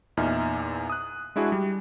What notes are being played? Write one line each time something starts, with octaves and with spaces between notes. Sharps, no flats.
E2 A#2 D#4 E5 F6
D#6 F#6
G#3 D4 E4 F#4 G#4
G3